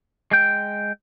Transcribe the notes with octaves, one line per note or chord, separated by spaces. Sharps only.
G#3 G5